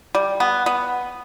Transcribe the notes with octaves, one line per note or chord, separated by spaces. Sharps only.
G3
B3
B3